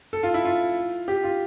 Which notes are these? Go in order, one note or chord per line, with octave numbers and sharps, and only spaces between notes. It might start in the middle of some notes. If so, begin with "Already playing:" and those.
A4
F4
E4
F4
G4
F4